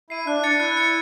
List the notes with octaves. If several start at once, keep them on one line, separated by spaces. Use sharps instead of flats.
E4 C7 D#7
D4 F#6
A6 C#7
E4 F#6
A6 C#7